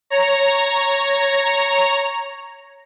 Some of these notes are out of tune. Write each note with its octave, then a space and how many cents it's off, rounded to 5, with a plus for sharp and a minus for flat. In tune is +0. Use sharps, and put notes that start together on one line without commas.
C#5 +0 A#5 -5